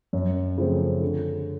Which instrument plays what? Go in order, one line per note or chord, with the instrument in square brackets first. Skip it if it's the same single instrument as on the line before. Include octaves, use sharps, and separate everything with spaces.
[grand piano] F#2
C#3 F3 A3 C4
D3